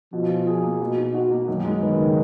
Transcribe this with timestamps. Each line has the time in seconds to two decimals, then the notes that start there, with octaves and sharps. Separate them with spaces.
0.13 B2 F3
0.29 F4
0.47 G#4
0.63 A#3
0.81 B2
0.97 D#4
1.14 F#4
1.31 A#3
1.47 F#2 D#3
1.65 G#3
1.81 D#3 B3
1.99 C#3